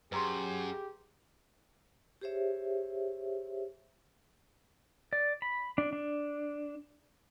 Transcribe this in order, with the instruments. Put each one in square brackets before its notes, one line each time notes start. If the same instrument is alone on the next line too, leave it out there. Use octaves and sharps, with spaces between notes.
[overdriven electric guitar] F#2 [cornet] G4 [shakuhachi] G#4 [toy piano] B4 A#5 C6
[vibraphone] G4 G#4 C5 C#5 E5
[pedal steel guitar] D5
B5
D4
D4